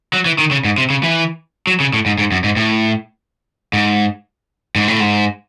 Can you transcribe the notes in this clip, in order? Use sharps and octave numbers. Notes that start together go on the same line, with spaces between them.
F#3
E3
D#3
C#3
G#2
C3
C#3
E3
F#3
C#3
A2
G#2
G#2
F#2
G#2
A2
G#2
G#2
A2
G#2